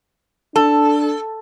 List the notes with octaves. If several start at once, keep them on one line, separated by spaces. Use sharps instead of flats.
D4 A4